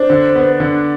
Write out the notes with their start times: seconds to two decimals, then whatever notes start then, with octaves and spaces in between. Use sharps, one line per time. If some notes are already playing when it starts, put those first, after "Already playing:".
Already playing: D4 C5
0.10 D3
0.35 B3
0.60 D3